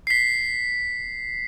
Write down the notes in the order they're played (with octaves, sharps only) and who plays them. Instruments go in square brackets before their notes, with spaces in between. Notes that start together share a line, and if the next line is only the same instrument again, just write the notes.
[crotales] B6 C7